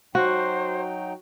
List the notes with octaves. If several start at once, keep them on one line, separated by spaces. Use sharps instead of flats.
F#3 D#4 F#4 C5 G5